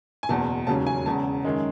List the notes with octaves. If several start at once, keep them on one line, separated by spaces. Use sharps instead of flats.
G#5
F#1 E2 B2 A5
E1 D#2 C#3 F#3 C#4 A5
G#5
E1 E2 C#3 A5
F#2 D#3 G#3